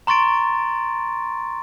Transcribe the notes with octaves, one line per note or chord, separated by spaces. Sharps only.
A#5 C6 C#6 A6 D7